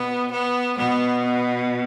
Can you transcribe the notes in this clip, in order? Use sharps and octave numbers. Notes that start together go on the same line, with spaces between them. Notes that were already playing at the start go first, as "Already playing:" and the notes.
Already playing: B2 B3
B3
B2 B3
B3